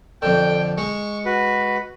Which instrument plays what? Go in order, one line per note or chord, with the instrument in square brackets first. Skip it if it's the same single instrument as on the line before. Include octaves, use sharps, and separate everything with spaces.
[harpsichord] F2 D3 [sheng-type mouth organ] G5
[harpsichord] G#3 [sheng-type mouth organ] C#6
[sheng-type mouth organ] F#4 B4